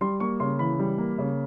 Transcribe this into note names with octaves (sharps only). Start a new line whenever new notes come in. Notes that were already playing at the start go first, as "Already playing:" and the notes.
G3 C6
A#3 C#6
C#3 C6
E3 B5
G3
A#3
C#3